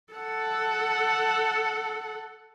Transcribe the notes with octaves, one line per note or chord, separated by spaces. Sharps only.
A4 F#5